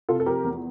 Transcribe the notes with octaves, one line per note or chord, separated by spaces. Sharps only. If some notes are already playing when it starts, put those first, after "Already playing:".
C3 F4 A4
A4
F3 G4 A#4
E2